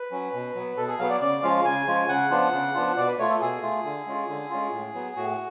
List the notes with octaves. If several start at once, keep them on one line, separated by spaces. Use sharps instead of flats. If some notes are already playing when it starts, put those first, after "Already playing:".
Already playing: B4
F#3 C#4
B2
F#3 B3
B2 A4
G#4
F#3 B3 F5
D5
C#3 D5
F3 G#3 C#4 F4 F5
C#3 G#5
F3 G#3 C#4 F4
C#3 F#5
F3 B3 D4 F4
C#3
F3 B3 D4 F4
B2 D5
B4
A3 F4 C#5
A4
B2 G#4
A3 F4
D3
G#3 C#4 F4
D3
G#3 C#4 F4
A2
F#3 B3
A2 F#4